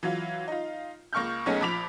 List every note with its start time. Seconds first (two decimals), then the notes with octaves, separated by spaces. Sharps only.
0.03 E3 F#3 F4
0.48 D#4 F4
1.13 C#2 A#3 C#6 F6 G6
1.46 B1 A3 B3 C#4 D#4 G#4
1.61 A#1 F3 B5 D6 B6 F7